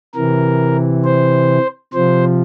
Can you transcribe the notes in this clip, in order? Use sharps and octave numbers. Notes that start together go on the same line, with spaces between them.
C3 E3 A#4
C5
C3 F3 C5